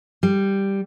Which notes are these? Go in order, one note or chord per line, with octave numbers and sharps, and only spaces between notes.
G3